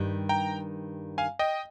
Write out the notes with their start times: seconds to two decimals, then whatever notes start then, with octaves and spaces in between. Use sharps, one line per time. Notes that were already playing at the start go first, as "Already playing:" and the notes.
Already playing: G2 D#3 G3
0.29 G5 A#5
1.18 F5 G#5
1.39 D#5 G5